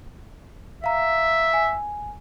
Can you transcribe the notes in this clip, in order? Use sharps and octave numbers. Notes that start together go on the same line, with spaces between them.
E5 F5 A#5
G#5